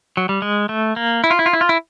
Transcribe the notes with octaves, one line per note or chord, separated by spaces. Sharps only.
F#3
G3
G#3
A3
A#3
E4
F4
E4
F4
E4
F4
E4